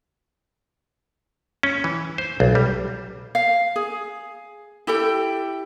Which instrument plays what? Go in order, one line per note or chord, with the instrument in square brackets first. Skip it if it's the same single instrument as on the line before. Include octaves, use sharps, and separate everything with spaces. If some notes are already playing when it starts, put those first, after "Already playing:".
[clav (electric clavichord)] C#4
E3
C5
B1
G3
[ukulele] F5
G#4
E4 G4 A4 G5